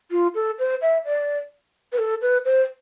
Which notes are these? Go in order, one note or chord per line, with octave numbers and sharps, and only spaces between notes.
F4
A4
C5
E5
D5
B4
A4
B4
C5